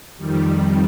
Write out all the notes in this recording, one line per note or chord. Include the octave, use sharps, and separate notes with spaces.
F2 D#3 G3